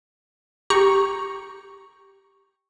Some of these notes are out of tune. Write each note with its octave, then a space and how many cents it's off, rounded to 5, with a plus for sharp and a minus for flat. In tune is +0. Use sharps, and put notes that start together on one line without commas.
G4 +0 A#5 +0 C#6 +0